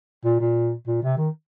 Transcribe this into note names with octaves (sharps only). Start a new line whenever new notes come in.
A#2
A#2
A#2
C3
D#3